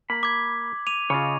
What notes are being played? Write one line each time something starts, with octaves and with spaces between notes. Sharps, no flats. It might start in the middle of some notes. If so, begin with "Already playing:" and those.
A#3 B5
D6 G#6
D6 D#7 F7
C#3 F4 C#5 D#5